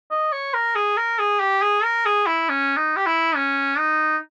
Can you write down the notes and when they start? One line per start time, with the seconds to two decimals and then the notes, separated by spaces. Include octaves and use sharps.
0.11 D#5
0.32 C#5
0.54 A#4
0.76 G#4
0.97 A#4
1.19 G#4
1.40 G4
1.62 G#4
1.83 A#4
2.06 G#4
2.27 E4
2.49 C#4
2.77 D#4
2.96 G4
3.06 E4
3.36 C#4
3.78 D#4